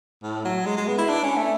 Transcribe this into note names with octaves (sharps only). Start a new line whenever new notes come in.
A2
F#3
G#3
G#3
B3
E4
D4
C#4
A3